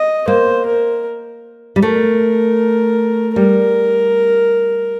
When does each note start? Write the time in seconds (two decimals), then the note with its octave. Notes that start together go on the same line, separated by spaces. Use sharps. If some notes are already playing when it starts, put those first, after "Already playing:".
Already playing: D#5
0.28 A#3 C5
0.66 A#4
1.76 G3
1.82 A3 A#4
3.35 G3 A#4